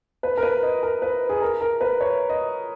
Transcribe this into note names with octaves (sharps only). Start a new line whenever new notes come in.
B4
A#4
B4
D#5
A#4
B4
G#4
A#4
A#4
B4
C#5
D#5